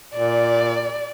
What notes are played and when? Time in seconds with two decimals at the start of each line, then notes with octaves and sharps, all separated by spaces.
0.14 A#2 D5